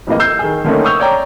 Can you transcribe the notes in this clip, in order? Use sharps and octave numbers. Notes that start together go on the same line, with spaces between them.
F2 A2 E3 A#3 D#5
E6 G6 C7
D#3 G#4
D3 D#3 A3 A#3 C#4 D#4
C#6 D#6 E6 G6 F7
C#5 D5 G5 A#5